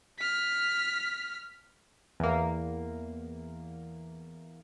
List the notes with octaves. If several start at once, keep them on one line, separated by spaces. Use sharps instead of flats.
F6 B6
E2 A#3